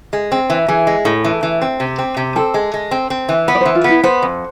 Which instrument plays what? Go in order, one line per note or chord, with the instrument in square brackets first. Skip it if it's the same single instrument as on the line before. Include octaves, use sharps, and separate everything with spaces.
[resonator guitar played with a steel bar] G#3
C4
E3
[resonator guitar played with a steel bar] E3 [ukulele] G#4
[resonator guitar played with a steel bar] G#3
A2
E3
E3
C4
C3
C4
C3
[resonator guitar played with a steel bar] C4 [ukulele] A4
[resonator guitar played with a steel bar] G#3
G#3
C4
C4
E3
[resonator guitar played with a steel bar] B3 [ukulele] B4
[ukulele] D5
[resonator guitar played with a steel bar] E3 [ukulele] C5
[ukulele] F4
[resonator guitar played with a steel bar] B3
[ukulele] E4
[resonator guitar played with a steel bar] B3 [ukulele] C5
[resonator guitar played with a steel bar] F2